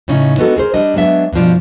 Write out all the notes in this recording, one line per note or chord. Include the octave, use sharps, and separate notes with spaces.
A2 C#3 C#4 D#4
G#3 B3 D4 D#4 F#4 A4
G#4 A#4 C5
G3 D4 D#5
F#3 G#3 B3 D4 E5
G2 B2 F3 D5